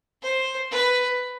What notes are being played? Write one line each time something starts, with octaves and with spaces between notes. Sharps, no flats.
C5
B4